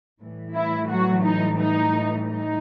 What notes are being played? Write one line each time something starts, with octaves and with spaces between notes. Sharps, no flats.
A2 E3 G3
E4
F#3 F#4
D#4
D#4
D#4